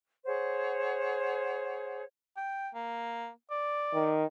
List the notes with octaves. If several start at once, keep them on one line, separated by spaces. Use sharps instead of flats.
G#4 C5 C#5 F#5
G5
A#3
D5
D#3